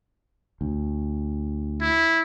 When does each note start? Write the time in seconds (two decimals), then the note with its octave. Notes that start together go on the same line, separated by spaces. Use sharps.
0.61 D2
1.80 E4